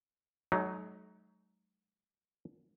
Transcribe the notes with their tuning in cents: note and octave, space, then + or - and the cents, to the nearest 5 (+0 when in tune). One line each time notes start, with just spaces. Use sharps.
F#3 +15 A3 -40 D#4 -5